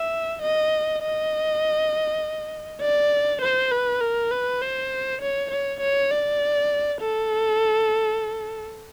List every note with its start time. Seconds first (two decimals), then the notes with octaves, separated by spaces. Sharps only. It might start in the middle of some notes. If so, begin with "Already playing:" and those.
Already playing: E5
0.42 D#5
1.02 D#5
2.82 D5
3.41 C5
3.72 B4
4.01 A#4
4.31 B4
4.62 C5
5.21 C#5
5.51 C#5
5.81 C#5
6.11 D5
7.01 A4